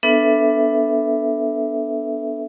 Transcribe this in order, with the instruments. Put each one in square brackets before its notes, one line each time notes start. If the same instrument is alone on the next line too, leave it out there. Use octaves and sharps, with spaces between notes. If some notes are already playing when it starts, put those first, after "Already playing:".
[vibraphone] B3 D4 A4 B4 E5